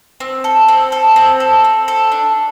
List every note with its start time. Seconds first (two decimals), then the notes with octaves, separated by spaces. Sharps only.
0.20 C4
0.44 A4
0.68 C4
0.92 A4
1.16 C4
1.40 A4
1.64 C4
1.88 A4
2.12 D4